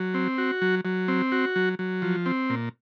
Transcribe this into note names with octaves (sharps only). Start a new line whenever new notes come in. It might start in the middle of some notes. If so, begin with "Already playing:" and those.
Already playing: F#3
C4
F#4
F#3
F#3
C4
F#4
F#3
F#3
F3
C4
A#2